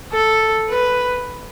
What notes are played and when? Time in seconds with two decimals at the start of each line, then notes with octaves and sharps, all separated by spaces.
0.13 A4
0.69 B4